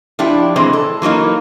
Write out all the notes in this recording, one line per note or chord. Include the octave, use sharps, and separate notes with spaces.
F3 D4 E4 G4
A#2 E3 G#3 C4 C5
A4
E3 F#3 A#3 D#4